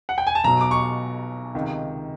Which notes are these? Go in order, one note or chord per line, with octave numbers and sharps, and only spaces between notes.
F#5
G5
G#5
A5
B1 B2 F#3 A#5
D6
C#6
C#2 C3 D#3